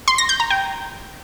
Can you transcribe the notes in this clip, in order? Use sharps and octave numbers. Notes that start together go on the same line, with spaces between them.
C6
A#6
G6
A#5
G5